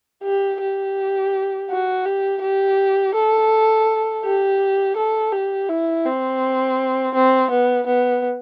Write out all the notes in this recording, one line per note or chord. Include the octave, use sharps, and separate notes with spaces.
G4
G4
F#4
G4
G4
A4
G4
A4
G4
E4
C4
C4
B3
B3